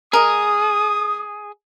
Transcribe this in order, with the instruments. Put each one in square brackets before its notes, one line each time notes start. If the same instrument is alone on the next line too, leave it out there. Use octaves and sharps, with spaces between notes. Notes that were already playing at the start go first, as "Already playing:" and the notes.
[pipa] G#3 A#4 [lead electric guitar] G#4 [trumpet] D#6